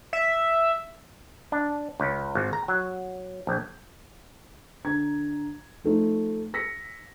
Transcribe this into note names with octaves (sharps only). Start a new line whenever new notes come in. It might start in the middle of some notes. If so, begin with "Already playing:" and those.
E5
D4
C#2
G#1
A#5
F#3
A#1
D3 A#5 G#6
F3 A3 D#4 F4
E6 A#6 B6 C#7